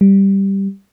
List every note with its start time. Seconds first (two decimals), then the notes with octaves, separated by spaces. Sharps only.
0.01 G3